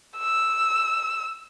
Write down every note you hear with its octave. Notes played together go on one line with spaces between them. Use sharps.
E6